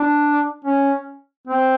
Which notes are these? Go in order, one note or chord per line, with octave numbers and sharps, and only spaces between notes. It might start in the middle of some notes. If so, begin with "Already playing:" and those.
Already playing: D4
C#4
C4